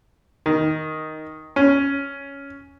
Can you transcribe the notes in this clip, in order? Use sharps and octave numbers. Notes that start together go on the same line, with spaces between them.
D#3
C#4